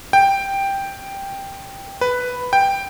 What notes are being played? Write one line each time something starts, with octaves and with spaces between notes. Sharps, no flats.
G5
B4
G5